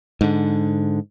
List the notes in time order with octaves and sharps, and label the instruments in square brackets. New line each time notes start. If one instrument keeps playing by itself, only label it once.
[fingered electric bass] G#2 D3